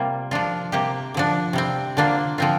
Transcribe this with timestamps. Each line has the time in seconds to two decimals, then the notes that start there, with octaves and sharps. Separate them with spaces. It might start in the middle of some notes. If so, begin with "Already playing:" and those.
Already playing: C3 G3 A#3 F4
0.31 F3 D4 F4
0.72 C3 A#3 G4
1.14 D3 F3 D4
1.53 C3 G3 C4
1.97 D3 A#3 D4 F4
2.38 D3 F3 C4 F4